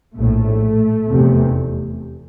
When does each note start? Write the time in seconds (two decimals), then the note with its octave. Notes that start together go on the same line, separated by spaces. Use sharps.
0.15 A#1 A2 A3
1.08 F1 E2 C3